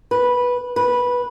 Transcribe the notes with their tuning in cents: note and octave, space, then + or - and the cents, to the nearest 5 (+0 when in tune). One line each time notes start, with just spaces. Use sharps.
B4 -10
B4 -10